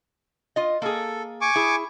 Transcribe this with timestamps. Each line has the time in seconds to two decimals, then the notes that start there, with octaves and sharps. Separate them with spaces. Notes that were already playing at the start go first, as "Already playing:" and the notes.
0.56 F4 D#5
0.82 A#3 G#4 A4
1.41 G#5 C#6 D6
1.55 E4 G#4